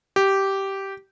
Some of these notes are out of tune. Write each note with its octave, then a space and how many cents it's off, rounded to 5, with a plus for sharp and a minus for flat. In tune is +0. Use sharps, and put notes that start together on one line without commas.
G4 -10